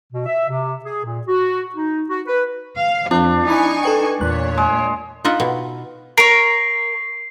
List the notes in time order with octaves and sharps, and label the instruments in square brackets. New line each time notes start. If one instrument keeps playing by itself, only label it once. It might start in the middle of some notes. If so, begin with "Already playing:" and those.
[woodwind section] B2
E5
C3
G#4
A#2
F#4
D#4
F#4
B4
[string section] F5
[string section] F2 [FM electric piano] C4 F4 [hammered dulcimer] D4
[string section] D#4 G#5 C#6 [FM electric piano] E4 B5
[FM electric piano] A4 B4 G5
[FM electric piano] E2 F#6 [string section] A#2 C#5
[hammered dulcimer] G#3
[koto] D#4 F4 E5 F#5
B2
[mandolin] A#4 C#5 [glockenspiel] C7